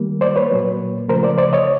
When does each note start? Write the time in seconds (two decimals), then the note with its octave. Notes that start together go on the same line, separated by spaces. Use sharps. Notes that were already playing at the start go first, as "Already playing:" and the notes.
Already playing: D#3 G3 A#3
0.21 C5 D5
0.36 B4 C#5
0.51 A#2 F#3 A#3
1.08 C#3 F3 A3 A#4 C5
1.23 C5 D5
1.38 C5 D5
1.53 C#5 D#5